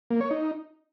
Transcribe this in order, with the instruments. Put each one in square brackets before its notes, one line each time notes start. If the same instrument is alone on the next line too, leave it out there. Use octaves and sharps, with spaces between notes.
[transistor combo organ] A#3
C#5
D#4